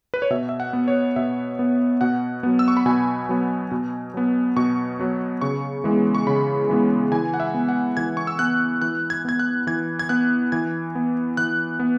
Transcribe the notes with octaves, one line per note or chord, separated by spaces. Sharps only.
B4
C#5
B2 E5
E5
F#5
B3
C#5
B2 E5
B3
B2 F#5
F#3 B3
E6
C#6
B5
B2 G#5
F#3 B3
B2
F#3 B3
B2 C#6
F#3 B3
C#3 C#6
E3 G#3 B3
C#6
C#3 B5
E3 G#3 B3
E3 G#5
F#5
E5
B3
F#5
E3 G#6
C#6
E6
B3 F#6
E3 F#6
G#6
B3 G#6
F#6
E3 G#6
G#6
B3 F#6
E3 G#6
B3
E3 F#6
B3